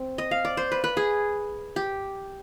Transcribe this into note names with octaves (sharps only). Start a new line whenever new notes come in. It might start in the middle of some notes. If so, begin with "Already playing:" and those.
Already playing: C4
D#5
F5
D5
C5
B4
B4
G#4
G4